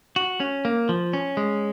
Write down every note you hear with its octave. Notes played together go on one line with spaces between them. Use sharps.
F#4
C#4
A#3
F3
C#4
G#3